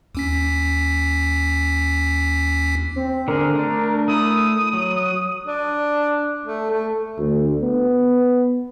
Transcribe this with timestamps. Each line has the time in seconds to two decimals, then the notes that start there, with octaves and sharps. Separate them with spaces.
0.15 D#2 C#4 B6
2.96 C4
3.28 D3 G#4 A#4
3.55 A3 D4
4.08 A3 E4 D#6
4.73 F#3
5.46 D4
6.46 A3
6.71 A3
7.18 D2
7.62 B3